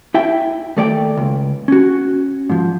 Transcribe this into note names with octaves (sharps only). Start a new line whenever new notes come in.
E4 E5 G5
D#2 A3 D5 G5
C#2
C#4 F#4
G#2 F3